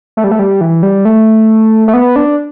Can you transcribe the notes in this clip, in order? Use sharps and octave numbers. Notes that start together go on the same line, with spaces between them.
A3
G3
A3
G3
E3
G3
A3
A3
B3
D4